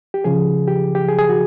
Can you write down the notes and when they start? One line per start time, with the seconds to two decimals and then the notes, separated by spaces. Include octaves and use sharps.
0.14 G4
0.24 C#3 F3 G#4
0.68 G4
0.95 G4
1.09 G#4
1.19 G#4
1.29 F#4